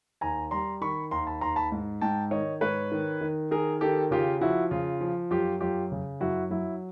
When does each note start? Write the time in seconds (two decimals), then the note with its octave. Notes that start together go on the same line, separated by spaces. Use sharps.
0.21 D#2 G#5 A#5
0.51 G3 A#5 C6
0.81 D#3 B5 C#6
1.11 D#2 A#5 C6
1.27 A5 B5
1.41 D#2 A#5 C6
1.56 A5 B5
1.72 G#2
2.01 G#2 G5 A5
2.31 D#3 C#5 D#5
2.61 G#2 B4 C#5
2.92 D#3
3.21 D#3
3.51 D#3 G#4 A#4
3.81 D#3 G4 A4
4.11 C#3 F4 G4
4.41 F3 E4 F#4
4.71 C#3 F4
5.01 F3
5.31 F#2 F4 G4
5.61 F#2 F4 G4
5.92 C#3
6.21 F#2 E4 F#4
6.50 F#3 E4